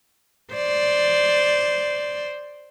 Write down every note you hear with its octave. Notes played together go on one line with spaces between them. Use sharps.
C5 D5